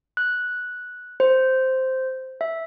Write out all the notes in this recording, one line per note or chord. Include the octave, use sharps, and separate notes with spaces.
F#6
C5
E5